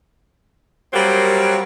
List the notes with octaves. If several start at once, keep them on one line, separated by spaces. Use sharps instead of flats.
F#3 G3 A#3 C4 G4 A#4